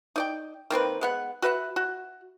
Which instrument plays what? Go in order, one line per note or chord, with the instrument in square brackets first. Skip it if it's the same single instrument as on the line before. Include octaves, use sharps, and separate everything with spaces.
[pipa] D#4 D5 G5
D#3 A#3 C4 B4
G#3 B3 F#5
F#4 B4 E5 F#5
F#4